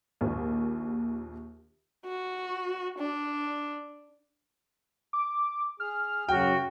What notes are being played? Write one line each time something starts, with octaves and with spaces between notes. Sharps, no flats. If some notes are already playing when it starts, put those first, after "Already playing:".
A#1 D#2
F#4
D4
D6
G#4 F6
F#2 C#3 F#3 F#4 G5